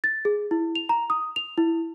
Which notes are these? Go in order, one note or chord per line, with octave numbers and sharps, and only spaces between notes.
A6
G#4
E4
F7
A#5
D#6
F7
E4